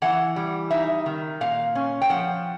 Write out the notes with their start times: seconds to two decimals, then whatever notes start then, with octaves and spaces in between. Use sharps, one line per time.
0.02 E3 F#5
0.36 G3
0.71 D#4 E5
1.06 D#3
1.41 A#2 F5
1.75 C#4
2.02 G5
2.10 F3 F#5